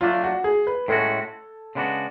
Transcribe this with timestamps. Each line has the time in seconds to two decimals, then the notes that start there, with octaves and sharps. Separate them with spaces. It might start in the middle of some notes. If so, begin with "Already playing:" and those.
0.01 F#3 A3 D4 F4
0.24 F#4
0.44 G#4
0.67 B4
0.88 A2 G#3 C#4 F#4 A4
1.75 C#3 G#3 B3 D4 F#4